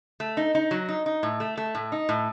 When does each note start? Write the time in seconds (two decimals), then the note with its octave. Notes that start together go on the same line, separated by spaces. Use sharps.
0.20 A3
0.37 D#4
0.55 D#4
0.71 F#3
0.89 D#4
1.06 D#4
1.23 A2
1.40 A3
1.57 A3
1.75 A2
1.92 D#4
2.09 A2